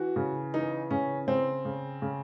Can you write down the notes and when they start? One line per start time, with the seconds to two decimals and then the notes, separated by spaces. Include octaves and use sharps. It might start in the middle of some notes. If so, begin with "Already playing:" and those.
Already playing: E3 F#4
0.16 C#3
0.54 E3 D#4
0.91 C#3 C#4
1.27 C#3 C4
1.65 C#3
2.02 C#3